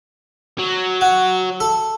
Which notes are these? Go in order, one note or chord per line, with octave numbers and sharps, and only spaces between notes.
F#3
F#4
A4